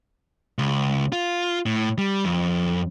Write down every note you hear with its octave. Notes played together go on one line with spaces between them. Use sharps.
C#2
F4
A2
G3
F2